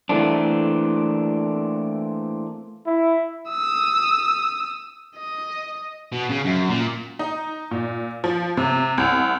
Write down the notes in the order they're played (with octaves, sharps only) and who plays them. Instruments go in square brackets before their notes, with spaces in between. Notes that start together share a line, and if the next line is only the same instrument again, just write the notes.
[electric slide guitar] E3 A3 A#3 C4 D4
[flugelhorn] E4
[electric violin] D#6 E6
D#5
[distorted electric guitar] B2
C#3
F#2
A#2
[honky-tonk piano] D#4
A#2
F3
C3
C2